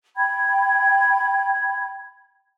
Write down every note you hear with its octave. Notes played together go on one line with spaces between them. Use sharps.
G5 B5 G#6